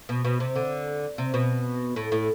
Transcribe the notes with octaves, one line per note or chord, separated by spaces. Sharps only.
B2
B2
C3
D3
C3
B2
A2
A2